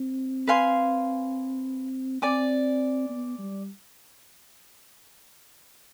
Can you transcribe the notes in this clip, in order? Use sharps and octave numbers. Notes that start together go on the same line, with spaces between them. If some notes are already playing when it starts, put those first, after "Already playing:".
Already playing: C4
B4 F5 G#5 C6
C4 D5 G#5 D6
B3
G3